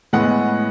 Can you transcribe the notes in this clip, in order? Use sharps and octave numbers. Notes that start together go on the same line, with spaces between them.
A2 G#3 B3 F#5